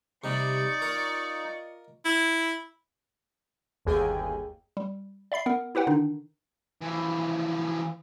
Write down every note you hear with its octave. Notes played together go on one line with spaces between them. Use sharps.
C3 G3 D#4 D5 C#6
F4 A#4 D#5
E4
G1 D#2 G#4 G5 G#5
G3
D5 E5 B5 C7
B3 A#4 F#5
E4 G4 B4 F#5 G5
D3 D#3 D4 D#4
E3 F3